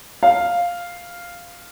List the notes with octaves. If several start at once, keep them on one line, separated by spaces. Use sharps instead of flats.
F5